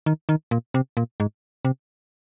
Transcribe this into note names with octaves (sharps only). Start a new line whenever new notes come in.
D#3
D#3
A#2
C3
A#2
G#2
C3